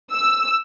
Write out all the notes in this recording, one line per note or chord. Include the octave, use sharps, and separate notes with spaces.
E6